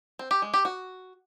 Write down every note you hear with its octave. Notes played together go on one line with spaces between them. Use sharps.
C4
G4
G#3
G4
F#4